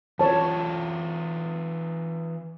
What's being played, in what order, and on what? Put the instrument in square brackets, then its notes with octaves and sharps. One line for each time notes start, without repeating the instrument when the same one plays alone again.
[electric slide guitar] E3 F4 D5 [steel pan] C#5 A5